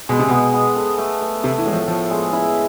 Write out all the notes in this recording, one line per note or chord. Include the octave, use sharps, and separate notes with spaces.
B2 G#3
C3
B2 B3
B3
A4
A3
A3
C3 A3
E3
A2 G#3
F3
F3 A4
G#3
E4